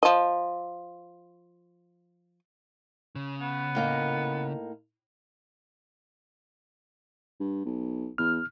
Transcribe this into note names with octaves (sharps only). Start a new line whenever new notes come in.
F3 D#5
C#3
B3
A2 A#3 D#4
G2
B1
E2 F6